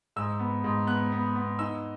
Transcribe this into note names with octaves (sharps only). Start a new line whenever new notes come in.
G#2 E6
B3
G#2
B3 F#6
B3
B3
D#4 E6